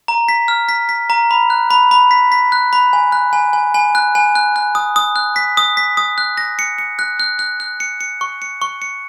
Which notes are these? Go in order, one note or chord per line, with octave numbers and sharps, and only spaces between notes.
A#5
B6
F6
B6
B6
A#5
B5
F#6
B5
B5
B6
B6
F#6
B5
G#5
F#6
G#5
G#5
G#5
F#6
G#5
F#6
F#6
D#6
D#6
F#6
B6
D#6
B6
D#6
F#6
A#6
C#7
C#7
F#6
F#6
F#6
F#6
C#7
C#7
C#6
C#7
C#6
C#7